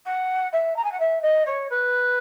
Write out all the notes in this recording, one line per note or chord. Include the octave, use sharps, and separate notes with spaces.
F#5
E5
A#5
G#5
F#5
E5
D#5
C#5
B4